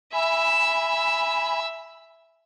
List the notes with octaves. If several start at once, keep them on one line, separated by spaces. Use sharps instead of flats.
E5 G#5 B5 E6